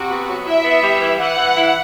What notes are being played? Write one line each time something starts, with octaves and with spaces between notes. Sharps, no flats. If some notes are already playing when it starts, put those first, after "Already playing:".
Already playing: C3 F#4
B3
F#3
E4 E5
B3
G3
E3
E3 F#5
E3
E4